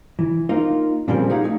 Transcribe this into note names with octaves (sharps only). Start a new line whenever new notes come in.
E3
A#3 D#4 F4
A#2 C#3 F3 G3 A#3 C4
D#4 G4 G#4 F5 F#5
A3 D#4